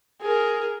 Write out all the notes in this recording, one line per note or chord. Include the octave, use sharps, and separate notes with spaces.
G#4 A#4